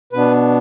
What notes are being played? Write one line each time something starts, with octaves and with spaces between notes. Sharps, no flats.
B2 B3 D4 B4